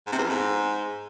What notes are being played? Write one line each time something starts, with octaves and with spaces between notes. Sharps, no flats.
G#2
C3
E2
F2
G#2